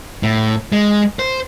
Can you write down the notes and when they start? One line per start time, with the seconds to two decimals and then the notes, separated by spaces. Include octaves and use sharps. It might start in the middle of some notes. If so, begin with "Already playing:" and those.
0.23 A2
0.72 G#3
1.19 C5